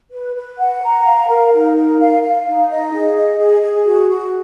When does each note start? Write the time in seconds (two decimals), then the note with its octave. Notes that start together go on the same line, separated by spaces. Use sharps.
0.12 B4
0.36 B4
0.58 F#5
0.82 A#5
1.05 F5
1.28 A#4
1.53 D#4
1.76 A#4
2.00 F5
2.22 F5
2.46 D#4
2.69 D#5
2.93 G#4
3.16 D#5
3.39 G#4
3.62 G#4
3.85 F#4
4.09 F#4